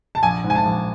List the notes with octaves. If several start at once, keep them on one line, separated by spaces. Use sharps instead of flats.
A5
A#1 G#5
G#2
G#5
A5
A#1